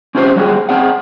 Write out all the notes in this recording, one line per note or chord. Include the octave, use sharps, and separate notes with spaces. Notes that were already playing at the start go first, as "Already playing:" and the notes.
C4 C#4 F4 G4 C5
F#3 G3 F#4 G#4
C4 G#4 F#5